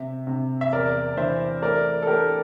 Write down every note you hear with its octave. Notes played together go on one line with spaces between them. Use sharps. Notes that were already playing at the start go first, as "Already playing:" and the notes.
Already playing: C3 E5
C3
E5
E2 A#4 D5
E3 C5 E5
A3 A#4 D5
A4
A3 G4 A#4